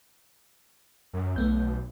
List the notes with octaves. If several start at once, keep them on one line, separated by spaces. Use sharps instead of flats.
F#2
B1 A3 B3 G6